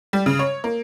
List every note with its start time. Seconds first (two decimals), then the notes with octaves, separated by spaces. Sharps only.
0.13 G3
0.26 C#3
0.39 C#5
0.64 A#3